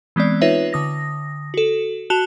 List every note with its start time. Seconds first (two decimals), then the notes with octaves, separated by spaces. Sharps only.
0.16 E3 G#3 B3 C4 D5
0.41 D#4 F4 B4 C#5 E5
0.73 D3 D#6 A#6
1.54 F#4 A4
2.10 F#4 A5 F#6 E7 F7 G7